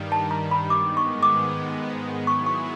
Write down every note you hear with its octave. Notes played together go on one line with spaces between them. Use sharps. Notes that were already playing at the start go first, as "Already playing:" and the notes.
Already playing: G2 D#3 G3
A5
A#5
B5
G#2 D#3 G#3 B3 D6
C#6
D6
F#3 B3 E4 G#4 C#6
C#6